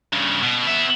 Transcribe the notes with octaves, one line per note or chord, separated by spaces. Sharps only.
G2 C#3
B2
B3 E5